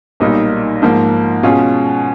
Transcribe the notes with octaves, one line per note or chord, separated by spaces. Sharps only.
B1 A#2 G3 A#3 D#4
G#2 F3 A#3
B2 G#3 C#4 F4 G#4